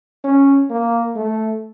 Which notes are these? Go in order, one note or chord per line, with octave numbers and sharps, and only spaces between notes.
C#4
A#3
A3